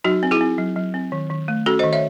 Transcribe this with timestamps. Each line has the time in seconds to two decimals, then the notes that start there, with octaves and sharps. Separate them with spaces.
0.04 F#3 D#4 F#4
0.23 C4
0.31 E4 G#4
0.41 C4
0.58 F#3
0.76 F#3
0.94 C4
1.12 D#3
1.30 D#3
1.48 A3
1.66 C#4 F#4 A4
1.79 C5 D#5
1.84 D#3
1.93 C#5 E5